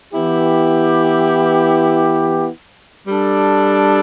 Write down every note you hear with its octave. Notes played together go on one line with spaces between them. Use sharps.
E3 B3 E4 G4
G3 D4 A4